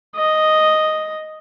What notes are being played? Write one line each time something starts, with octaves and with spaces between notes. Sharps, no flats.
D#5